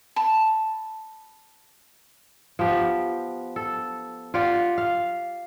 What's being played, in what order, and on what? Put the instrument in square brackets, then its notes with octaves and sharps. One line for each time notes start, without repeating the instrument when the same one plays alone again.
[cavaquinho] A5 B5
[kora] F3 B3 G4
A4
F4 G4 D5 F#5
F5